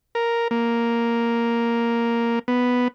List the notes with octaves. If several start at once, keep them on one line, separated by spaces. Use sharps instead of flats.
A#4
A#3
B3